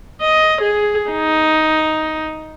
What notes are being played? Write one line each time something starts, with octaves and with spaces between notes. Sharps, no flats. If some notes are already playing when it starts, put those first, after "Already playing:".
D#5
G#4
D#4